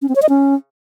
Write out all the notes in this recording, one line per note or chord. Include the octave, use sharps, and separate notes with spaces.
C#4
C4
C#5
D#5
C#4